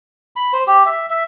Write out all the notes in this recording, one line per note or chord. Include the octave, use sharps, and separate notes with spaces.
B5
C5
G4
E5
E5